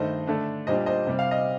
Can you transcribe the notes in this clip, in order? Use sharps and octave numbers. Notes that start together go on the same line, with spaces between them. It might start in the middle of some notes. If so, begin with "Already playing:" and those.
Already playing: G2 D#3 A3 C5 D#5
D3 A3 D4
A#2 G3 D4 C5 D#5
C5 D#5
C3 G3 C4
F5
D#5